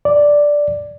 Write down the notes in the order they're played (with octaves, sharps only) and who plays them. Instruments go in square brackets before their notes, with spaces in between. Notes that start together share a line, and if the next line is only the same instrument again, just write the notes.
[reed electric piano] D5